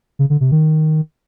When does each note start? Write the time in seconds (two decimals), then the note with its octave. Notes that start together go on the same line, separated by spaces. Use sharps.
0.19 C#3
0.30 D3
0.41 C3
0.51 D#3